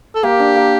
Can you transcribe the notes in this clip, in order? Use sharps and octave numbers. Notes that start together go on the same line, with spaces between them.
A4
A#3 G4
D4
A#3